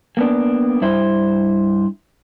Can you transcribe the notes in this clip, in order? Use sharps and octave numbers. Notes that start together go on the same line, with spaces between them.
A#3 B3 D4
G2 E4 C5